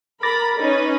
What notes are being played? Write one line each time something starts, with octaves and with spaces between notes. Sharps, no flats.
A#4 B5 D6 A6 A#6
C#4 D#4 B4